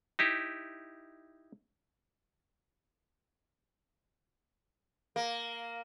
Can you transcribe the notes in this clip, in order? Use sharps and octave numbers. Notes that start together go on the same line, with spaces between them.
D#4 E4 G4
A#3